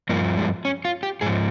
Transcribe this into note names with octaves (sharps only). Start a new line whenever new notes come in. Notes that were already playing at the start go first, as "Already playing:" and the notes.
G2 F3 A#3
G#3
C#4
F4
G4
G#2 F3 G#4